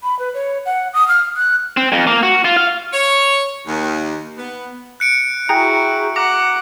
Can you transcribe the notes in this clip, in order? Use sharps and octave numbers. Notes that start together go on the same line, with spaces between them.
B5
B4
C#5
F#5
D#6
F6
F#6
C4
F2
A#3
F#4
F4
F5
C#5
D#2
B3
F#6 C#7 D7
E4 F#4 G#4 G5 A#5
F#5 A#5 D6